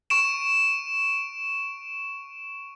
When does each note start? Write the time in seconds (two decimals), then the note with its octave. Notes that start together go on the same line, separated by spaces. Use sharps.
0.10 C#6 D7 E7